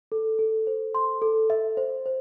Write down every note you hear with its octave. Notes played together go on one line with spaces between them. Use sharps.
A4
A4
C5
C6
A4
E5
C5
C5